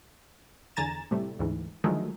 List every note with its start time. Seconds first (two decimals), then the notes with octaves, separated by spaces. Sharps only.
0.76 E2 D3 G#5 A#5 A6 E7
1.11 A2 C3 G3 A3
1.39 D2 G#2 E3
1.84 D3 D#3 F3 F#3 G#3 A3